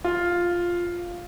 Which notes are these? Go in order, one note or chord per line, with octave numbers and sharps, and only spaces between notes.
F4